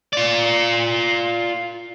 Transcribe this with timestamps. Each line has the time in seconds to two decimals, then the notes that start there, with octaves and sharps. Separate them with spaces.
0.13 F4 D5